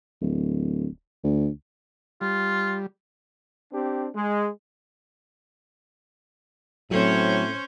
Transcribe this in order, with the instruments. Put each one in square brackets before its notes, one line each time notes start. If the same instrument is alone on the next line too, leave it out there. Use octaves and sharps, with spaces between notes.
[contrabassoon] D1
D2
[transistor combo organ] G3 [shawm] F4
[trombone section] C4 D4 G4
G#3
[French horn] A2 [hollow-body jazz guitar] F#3 [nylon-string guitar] A3 C4 [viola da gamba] C#4 C5 C#5